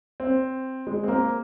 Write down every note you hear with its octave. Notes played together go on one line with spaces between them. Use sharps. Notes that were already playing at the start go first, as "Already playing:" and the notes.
C4
G#3
C4
A#3